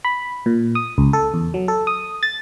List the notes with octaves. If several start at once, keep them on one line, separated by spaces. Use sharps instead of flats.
B5
A#2
D#6
C#2
A4
E2
F#3
A4
D#6
A6